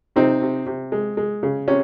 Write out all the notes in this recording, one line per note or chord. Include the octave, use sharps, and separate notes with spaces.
C3 C4 D#4
C3
C3
G#3
G#3
C#3
C3 C#4